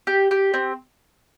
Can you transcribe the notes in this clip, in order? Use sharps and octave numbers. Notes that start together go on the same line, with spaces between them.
G4
G4
C4